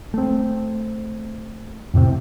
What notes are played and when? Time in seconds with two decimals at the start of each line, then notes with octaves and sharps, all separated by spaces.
0.14 A3 C4
1.94 F2 A2 C3 C4